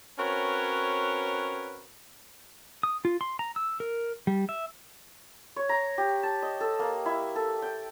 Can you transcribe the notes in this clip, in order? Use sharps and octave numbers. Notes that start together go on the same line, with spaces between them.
C4 C#4 F#4 A#4 B4 C#5
D#6
F4
C6
A#5
E6
A#4
G3
E5
C#5
A#5
G4
A5
D#5
A4
A#3
E4
A4
G5